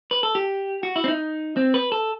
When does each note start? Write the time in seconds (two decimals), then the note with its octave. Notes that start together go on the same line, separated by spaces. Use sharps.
0.11 B4
0.23 A4
0.35 G4
0.83 F#4
0.96 E4
1.04 C4
1.08 D#4
1.57 C4
1.74 B4
1.92 A4